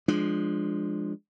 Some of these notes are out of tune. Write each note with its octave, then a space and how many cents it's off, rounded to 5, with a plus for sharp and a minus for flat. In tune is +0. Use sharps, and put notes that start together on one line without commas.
F3 +0 G#3 +0 D4 +15